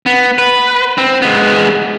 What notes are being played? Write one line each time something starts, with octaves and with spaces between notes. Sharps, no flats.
B3
B4
C4
G#3 B3